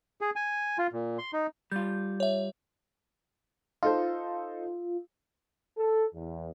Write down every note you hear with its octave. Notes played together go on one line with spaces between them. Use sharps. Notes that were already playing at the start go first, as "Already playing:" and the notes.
G#4
G#5
F4
A#2
C6
D#4
G3 F4 G6
C#5 E5
D#4 F4 A4 C5
A4
E2